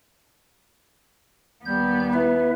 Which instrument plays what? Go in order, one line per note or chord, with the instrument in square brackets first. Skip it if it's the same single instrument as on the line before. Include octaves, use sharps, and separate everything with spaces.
[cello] D#2 B3 [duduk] G3 [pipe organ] G6
[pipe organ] E4 B4 E5